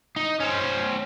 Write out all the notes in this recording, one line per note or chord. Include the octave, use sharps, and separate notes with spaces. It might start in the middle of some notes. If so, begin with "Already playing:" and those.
D#4
C#4 C5